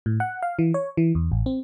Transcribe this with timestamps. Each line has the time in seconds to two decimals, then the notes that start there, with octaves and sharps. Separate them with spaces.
0.06 A2
0.20 F#5
0.42 F5
0.59 E3
0.74 C#5
0.97 E3
1.15 E2
1.32 A1
1.46 C4